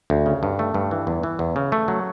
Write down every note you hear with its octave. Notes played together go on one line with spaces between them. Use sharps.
D2
C#3
G2
A3
G2
E3
E2
E3
E2
C#3
A3
F#3